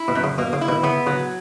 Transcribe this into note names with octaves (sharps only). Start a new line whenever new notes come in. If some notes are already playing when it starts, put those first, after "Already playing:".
Already playing: E4
B2
F#2
C#3
B2 A#3
C#3
E4
B2 D#3
C#3 B3
C#3 F#3